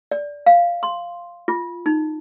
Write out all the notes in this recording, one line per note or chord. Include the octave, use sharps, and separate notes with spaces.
D5
F5
C6
F4
D#4